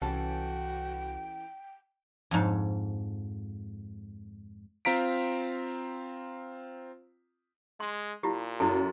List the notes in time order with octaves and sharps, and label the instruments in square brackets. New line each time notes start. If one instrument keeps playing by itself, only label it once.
[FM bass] C2 [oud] E3 C#4 A4 [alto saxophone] F#4 [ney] G5
[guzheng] F2 G#2
[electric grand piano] C4 F4 A#5 B6 D7
[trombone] G#3 [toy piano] C6
[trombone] A#2 [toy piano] E4 F4 G4
[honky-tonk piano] F#2 [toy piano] E4 A4